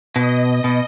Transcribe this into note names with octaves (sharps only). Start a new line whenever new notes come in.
B2 D#5
B2